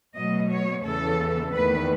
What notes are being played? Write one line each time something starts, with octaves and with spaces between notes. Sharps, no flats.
B2 F#3 A3 D#5
C#5
E2 C#3 E3 A4
E2 D#3 A3 B4